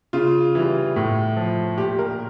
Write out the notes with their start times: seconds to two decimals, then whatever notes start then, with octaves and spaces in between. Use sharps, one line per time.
0.13 C#3 F4
0.55 E3 G3
0.96 A2
1.37 F3
1.78 A#2 G4
1.99 A#4